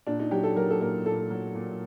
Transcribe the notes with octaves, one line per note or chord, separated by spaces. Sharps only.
A#2 D4
D#4
F#3 G4
A4
F#3 A#4
A4
A#2 A#4
A#2 A4
F#3
A#2